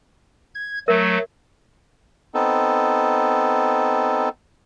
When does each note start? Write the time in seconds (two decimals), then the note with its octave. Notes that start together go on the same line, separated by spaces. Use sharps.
0.55 G#6
0.88 F#3 A3 A#4 E5
2.34 B3 C4 D#4 A4